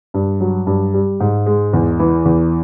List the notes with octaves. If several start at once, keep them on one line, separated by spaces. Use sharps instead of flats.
G2
F#3
G2
G3
G#2
G#3
E2
E3
E2